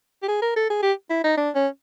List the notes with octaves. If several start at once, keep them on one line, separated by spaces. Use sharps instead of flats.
G4
G#4
A#4
A4
G#4
G4
E4
D#4
D4
C#4